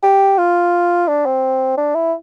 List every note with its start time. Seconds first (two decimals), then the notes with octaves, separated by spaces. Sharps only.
0.03 G4
0.38 F4
1.08 D4
1.26 C4
1.77 D4
1.95 E4